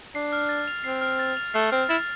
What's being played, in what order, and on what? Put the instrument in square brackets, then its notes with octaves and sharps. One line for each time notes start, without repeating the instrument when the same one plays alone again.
[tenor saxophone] D4 [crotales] C7
[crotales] F6
A6
F7
[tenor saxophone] C4 [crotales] C7
[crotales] F6
A6
F7
[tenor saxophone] A3 [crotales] C7
[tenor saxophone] C4 [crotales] F6
[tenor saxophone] E4 [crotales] A6